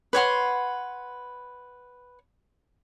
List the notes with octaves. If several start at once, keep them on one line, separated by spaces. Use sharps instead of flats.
B4 C#5 F#5 C6